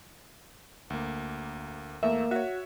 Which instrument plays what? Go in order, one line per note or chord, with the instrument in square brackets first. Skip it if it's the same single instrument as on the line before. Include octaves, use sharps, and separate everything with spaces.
[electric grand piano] D2 A#3
[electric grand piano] E2 A3 [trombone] A#3 [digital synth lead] E5
[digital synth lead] F#4 [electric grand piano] C#5 E5